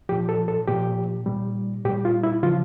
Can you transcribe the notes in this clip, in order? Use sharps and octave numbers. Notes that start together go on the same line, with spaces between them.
A#2 F3 G4
A4
A4
A#2 F3 G4
A#2 G3
A#2 G3 G4
F4
E4
C#3 F3 F4